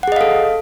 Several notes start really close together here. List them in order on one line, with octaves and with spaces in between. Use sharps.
F#5 G#4 D#5 F5 A4